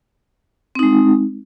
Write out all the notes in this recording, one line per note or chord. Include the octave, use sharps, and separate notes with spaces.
G#3 C4 D#4